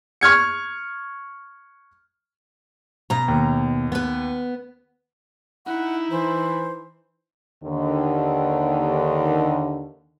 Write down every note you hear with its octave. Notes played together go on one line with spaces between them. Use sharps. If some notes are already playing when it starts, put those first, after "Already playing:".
C#6 F6 G#6 C#7
B2 A#5
D#2
B3 B4
D#4 E4 F#5
E3 C5
D#2 D3 D#3